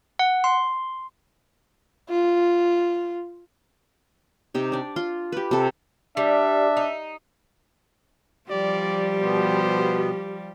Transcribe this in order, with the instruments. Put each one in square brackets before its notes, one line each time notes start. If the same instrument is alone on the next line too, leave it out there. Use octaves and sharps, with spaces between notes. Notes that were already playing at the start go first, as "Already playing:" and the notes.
[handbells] F#5
C6
[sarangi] F4
[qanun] C3 D#4 G4
D4 D5
F4 C6
G4 B4
C3 A4
[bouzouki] G3 [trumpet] D4 [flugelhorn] E5
[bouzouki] D#4
[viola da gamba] F3 G3 [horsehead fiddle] G4 [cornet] D5
[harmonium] B2 B3 [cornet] C5